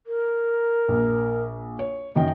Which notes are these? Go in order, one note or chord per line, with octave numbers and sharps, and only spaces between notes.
A#4
A#1
C#5
F#2 D#3 D#5 G5